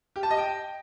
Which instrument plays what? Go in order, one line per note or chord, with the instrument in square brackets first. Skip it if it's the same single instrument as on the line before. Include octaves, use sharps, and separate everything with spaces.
[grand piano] G4
A5
D#5
G5